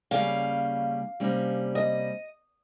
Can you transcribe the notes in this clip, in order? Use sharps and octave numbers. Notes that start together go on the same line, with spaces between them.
C#3 G3 A#3 C#4 F5
C3 G3 A#3 C#4
D#5